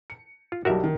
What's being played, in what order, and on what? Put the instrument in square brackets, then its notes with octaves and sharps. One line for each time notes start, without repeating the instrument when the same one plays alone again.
[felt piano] C#7
[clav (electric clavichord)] F4
[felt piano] B1 G3 G4 [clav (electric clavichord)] F#4 A#4 E5
[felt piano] D#3